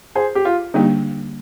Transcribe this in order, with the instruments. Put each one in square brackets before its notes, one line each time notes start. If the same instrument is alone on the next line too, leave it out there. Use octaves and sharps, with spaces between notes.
[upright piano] G#4 C5
G4
F4
[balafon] D3 G3 A#3 D4 G4 [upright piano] D#4